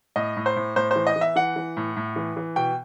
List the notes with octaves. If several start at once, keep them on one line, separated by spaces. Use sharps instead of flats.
A2 D#5
A2
C5
A2
A2 C5
E3 C5
D#5
E3
E5
E3 F#5
E3
A2
A2
E3
E3
B2 G5